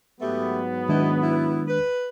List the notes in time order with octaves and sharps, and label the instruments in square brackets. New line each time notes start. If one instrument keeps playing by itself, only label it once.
[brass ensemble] G#2 F#3 B3 [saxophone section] A3 G4
[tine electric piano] D#3 G#3 D4 [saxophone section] E4 F#4 D#5
[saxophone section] E4
B4